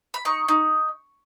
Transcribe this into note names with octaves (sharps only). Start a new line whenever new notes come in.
B5
D#4 C#6
D#4